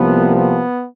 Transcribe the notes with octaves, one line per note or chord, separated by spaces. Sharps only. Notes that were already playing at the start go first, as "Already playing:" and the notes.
Already playing: C2 C3 F3 A#3 B3
B3